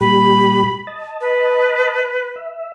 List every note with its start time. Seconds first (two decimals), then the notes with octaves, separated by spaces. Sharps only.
0.01 A#2 G3 G4 B5
0.87 D#5 A5
1.21 B4
2.36 E5